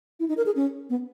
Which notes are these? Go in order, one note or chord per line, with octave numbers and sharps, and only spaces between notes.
E4
D#4
A#4
G#4
C#4
B3